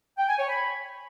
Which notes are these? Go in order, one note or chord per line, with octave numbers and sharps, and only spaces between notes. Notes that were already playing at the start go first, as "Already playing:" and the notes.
G5
G#5
C#5
B5